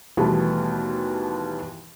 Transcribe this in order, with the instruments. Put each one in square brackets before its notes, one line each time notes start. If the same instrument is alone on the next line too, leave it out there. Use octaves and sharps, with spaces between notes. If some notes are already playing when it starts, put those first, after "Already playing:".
[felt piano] D#2 B2 E3 G3 A3 B3